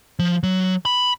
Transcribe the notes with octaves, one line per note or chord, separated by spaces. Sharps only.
F3
F#3
B5